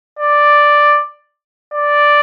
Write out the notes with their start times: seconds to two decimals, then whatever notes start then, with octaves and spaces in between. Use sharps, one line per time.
0.19 D5
1.74 D5